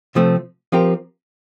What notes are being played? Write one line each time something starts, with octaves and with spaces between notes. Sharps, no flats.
C3 F3 A3 C4
F3 C4 G4 A#4